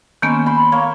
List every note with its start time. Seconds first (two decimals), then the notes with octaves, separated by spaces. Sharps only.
0.22 D#3 A#3 B3 C#4 A4 C5
0.46 B5 C6
0.72 A#3 C#5